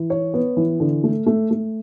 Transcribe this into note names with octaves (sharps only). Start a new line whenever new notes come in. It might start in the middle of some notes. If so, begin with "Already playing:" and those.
Already playing: E3
C#5
B3
E3
D3
A3
A3
A3